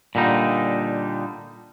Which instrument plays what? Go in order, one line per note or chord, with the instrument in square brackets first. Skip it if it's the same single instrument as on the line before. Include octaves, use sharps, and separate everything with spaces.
[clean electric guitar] A#2 D3 G3 D#4